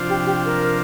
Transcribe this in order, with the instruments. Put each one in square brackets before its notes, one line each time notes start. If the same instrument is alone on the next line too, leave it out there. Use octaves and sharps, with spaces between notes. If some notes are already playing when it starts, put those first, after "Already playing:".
Already playing: [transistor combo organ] C3 F3 D4 F4 C5
[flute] G4
G4
A#4